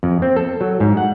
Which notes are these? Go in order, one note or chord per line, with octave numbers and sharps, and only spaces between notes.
F2
C4
A4
F#3
G#2
F#5